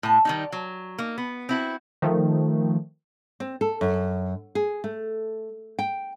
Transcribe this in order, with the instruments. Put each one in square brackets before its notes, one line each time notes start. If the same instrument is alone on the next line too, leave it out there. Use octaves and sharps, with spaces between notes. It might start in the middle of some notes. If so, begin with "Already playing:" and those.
[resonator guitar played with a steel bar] A2 A5
D#3 G3 D#4
F#3
A#3 D#4
B3
C4 E4 F#4
[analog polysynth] D#3 F3 A3
[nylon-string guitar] C4
A4
F#2
G#4
A3
G5